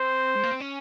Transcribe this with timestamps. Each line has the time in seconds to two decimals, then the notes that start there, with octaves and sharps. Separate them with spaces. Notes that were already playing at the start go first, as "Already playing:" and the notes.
Already playing: C4 C5
0.36 G#3
0.43 A#3
0.52 C4
0.60 C#4